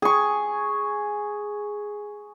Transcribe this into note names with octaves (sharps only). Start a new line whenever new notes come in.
G#4 C#6